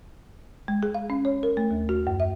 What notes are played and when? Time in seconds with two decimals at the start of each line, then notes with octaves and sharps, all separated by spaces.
0.68 G#3
0.83 G#4
0.95 F5
1.10 C#4
1.25 C#5
1.43 A#4
1.57 A3
1.71 D#2
1.89 F#4
2.07 F#2
2.20 E5